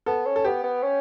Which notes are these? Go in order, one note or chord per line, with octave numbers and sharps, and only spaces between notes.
B3 A4
C#4
A4
B3 G4
B3
C#4